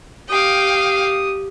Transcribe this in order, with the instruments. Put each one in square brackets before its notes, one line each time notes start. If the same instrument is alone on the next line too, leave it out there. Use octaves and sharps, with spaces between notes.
[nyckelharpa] G4 D#6 [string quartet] F5 G5